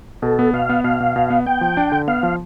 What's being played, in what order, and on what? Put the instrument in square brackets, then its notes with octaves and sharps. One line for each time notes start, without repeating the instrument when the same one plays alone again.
[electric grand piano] B2 [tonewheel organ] A4
[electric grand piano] B3
[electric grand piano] B2 [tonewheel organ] F5
[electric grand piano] B3
[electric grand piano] B2 [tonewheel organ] F5
[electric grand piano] B2
B2
B3
[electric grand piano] B3 [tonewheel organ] G5
[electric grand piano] F3
D4
D3
[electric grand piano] B3 [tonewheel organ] F5
[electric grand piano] F3